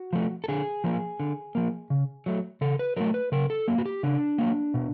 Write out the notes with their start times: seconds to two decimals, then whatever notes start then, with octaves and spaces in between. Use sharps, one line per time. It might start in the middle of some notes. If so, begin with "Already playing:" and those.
Already playing: F#4
0.13 F3 A3
0.44 A4
0.48 D3 G#4
0.84 F3 A#3
1.20 D3
1.55 F3 A#3
1.90 C#3
2.26 F#3 A3
2.61 C#3 A4
2.79 B4
2.97 F#3 A3 A#4
3.14 B4
3.32 C#3 A#4
3.50 A4
3.68 F#3 A#3
3.78 F#4
3.86 G4
4.03 C#3 D4
4.38 F#3 A#3
4.74 B2